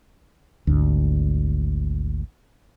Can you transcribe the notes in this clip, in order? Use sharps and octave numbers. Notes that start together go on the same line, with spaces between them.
G#1 D2